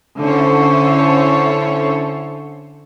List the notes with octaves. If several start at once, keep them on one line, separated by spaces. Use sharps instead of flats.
D3 C#4 E4 A4 C5 C#5